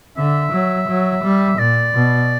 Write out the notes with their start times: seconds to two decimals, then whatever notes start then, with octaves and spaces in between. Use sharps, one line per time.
0.17 D3 E5
0.52 F#3
0.88 F#3
1.23 G3
1.58 A#2 D5
1.94 B2